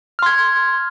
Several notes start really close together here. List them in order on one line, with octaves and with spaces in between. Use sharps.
F6 C6 G#6